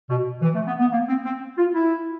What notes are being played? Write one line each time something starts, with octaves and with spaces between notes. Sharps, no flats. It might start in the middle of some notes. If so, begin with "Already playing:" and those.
B2
E3
A3
B3
B3
A#3
C4
C4
F4
E4